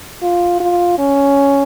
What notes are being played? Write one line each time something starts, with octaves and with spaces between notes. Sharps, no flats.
F4
F4
C#4